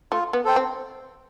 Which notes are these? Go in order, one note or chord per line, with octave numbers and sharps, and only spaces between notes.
A3 F4
B3
A4 C5 G5
C4